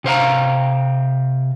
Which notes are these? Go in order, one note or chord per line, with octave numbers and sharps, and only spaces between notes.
C3 C5 F5 A#5